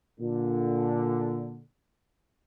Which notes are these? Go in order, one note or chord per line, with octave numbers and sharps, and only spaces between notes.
A#2 D3